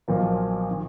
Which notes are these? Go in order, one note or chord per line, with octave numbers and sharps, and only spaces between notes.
B1 A#2 F3 A#3
D#3